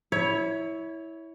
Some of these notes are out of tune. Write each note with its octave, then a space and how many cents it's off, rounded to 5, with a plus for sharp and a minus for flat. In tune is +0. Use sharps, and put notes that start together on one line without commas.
E4 -10 C#5 +15